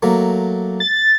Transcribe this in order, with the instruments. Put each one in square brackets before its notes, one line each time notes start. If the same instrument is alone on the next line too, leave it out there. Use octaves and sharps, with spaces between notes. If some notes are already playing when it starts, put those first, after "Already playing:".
[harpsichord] F#3 A3 A#3
[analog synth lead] A6